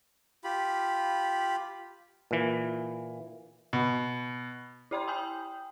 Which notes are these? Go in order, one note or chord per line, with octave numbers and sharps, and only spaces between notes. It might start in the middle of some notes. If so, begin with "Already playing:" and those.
F4 G4 B5
A#2 E3
B2
E4 G4 D5 G5 B5 C6
G5 G#5 D#6 G6